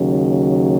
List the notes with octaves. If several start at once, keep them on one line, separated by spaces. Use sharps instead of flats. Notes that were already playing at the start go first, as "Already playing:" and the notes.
Already playing: D#2 C#3 F#3